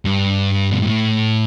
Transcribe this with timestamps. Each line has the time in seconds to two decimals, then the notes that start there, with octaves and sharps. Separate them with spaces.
0.05 G2
0.71 B2
0.81 A2